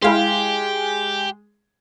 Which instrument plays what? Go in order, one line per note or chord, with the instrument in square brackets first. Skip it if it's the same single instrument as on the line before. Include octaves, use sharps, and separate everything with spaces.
[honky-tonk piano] G#3 G#4 [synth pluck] E4 F5 C6 [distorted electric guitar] G4